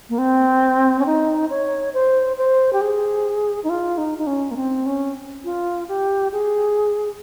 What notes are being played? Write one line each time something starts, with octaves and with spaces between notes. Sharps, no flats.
A#3
C4
C#4
D#4
C#5
C5
C5
G4
G#4
D#4
F4
D#4
D#4
C#4
A#3
C4
C#4
F4
G4
G#4